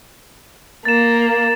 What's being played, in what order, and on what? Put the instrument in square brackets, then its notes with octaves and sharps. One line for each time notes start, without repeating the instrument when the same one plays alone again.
[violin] A#3 [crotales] A6 E7